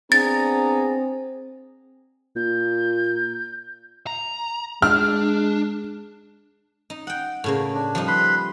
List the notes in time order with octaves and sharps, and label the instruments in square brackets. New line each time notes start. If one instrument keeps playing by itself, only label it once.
[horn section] B3 D4 A#5 [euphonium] C4 [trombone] G#4 [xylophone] A6
[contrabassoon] A#2 [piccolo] G6
[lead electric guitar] A#5
[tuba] G#3 [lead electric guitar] D4 [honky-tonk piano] F6
[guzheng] D#4
F#5 G5
A2 C#3 A#3
[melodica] D4
[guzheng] F3 G3 D#4
[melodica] B4 B5 C6